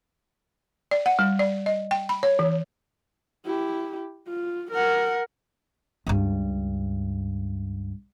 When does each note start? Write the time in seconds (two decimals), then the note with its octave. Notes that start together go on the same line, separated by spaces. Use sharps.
0.91 D5
1.06 F#5
1.19 G3
1.39 D5
1.66 D#5
1.91 G5
2.09 B5
2.23 C#5
2.39 E3
3.46 E4 G4
4.28 F4
4.72 A#4 F#5
6.07 C#2 G2